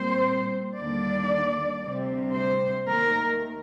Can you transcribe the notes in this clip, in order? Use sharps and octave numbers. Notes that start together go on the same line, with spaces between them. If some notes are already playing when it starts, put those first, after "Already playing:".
Already playing: A#2 G3 C4 C5
D#2 D3 G3 A#3 D4 D5
D2 C3 G3 C4
C5
D#2 D#3 A3 A#4